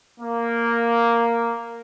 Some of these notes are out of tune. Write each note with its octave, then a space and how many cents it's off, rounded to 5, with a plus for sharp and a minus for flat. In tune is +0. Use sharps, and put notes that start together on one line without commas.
A#3 +0